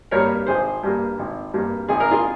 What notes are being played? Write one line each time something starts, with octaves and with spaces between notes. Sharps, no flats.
G2 G3 A#3 A#4 C#5
G#1 G#4 C5
G2 G3 A#3
G#1
G2 G3 A#3
G#1 G#4
A#4
F4 G#4